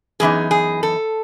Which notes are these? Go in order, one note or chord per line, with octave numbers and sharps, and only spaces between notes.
F#2 E3 B3 D#4 G#4
G#4
A4